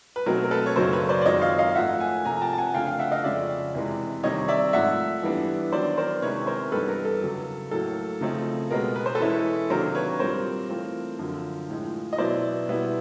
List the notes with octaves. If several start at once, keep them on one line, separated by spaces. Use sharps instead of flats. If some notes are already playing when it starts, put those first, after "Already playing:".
B4
B2 F#3 A3 C4 D#4 A#4
A#4
A4 B4
C#5
F#2 C#3 F#3 A#3 D#4 A#4 C5
B4 C#5
C5 D5
D5
F#2 D#3 G#3 C4 F4 C#5 D#5
D#5 F5
D#5 F5
F5
G#2 F3 A3 E5 F#5
F#5 G#5
C3 F3 A#3 G#5 A#5
A#5
G5 A5
A5
F#5 G#5
C#3 F3 A3 D4 F4 F5 G5
F5 G5
E5 F#5
D#5 F5
F2 C#3 F3 G#3 C#4 D5 E5
E2 C3 E3 G#3
C3 D#3 G3 C4 C#5 D#5
D5 E5
G#2 F3 A3 E5 F#5
E3 G3 B3 D4
D#3 F#3 B3 D4 C5 D5
A#4 C5
C3 D#3 G#3 C#4 E4 B4 C#5
A#4 C5
G2 E3 G3 B3 D#4 A4 B4
A#4
A4
E2 C#3 F#3
A2 F#3 A#3 A4
C#3 F3 A3 C4 D#4
B2 G#3 B3 A#4
B4
C5
A4 B4
E3 G#3 C#4 E4
C3 D#3 F#3 A#3 D4 A#4 C5
B4 C#5
A#2 G3 C4 A#4 C5
E3 A3 C4 F4
F#2 D3 F3
A2 F3 G#3
D#5
B2 F#3 B3 E4 C5 D5
B2 G3 B3 E4